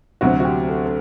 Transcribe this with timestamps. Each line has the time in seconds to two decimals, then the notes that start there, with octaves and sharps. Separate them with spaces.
0.21 D2 C3 F#3 C4 F#4
0.40 F#4
0.45 G4
0.68 A4
0.86 A4